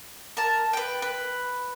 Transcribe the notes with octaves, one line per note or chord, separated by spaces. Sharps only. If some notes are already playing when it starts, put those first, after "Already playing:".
A#4 A5
B4 G5
B4